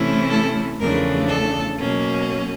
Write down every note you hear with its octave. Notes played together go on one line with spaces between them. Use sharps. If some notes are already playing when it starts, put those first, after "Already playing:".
Already playing: C3 E3 A3 C#4 E4
A4
E2 C#3 F3 A3 D4 A#4
A4
B2 F#3 A#3 C#4